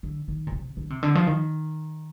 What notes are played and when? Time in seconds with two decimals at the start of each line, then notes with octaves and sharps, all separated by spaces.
0.03 D3
0.28 D#3
0.47 A#2
0.52 C3
0.77 D3
0.90 C3
1.03 D3
1.15 F3
1.27 D#3